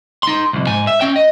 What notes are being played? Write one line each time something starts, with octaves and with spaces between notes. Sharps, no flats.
D#4 C6
C2 F2
G#2 G#5
E5
C#4 G5
D#5